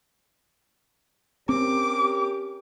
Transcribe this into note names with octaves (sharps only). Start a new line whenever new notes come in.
C4 C#4 G4 A#4 D6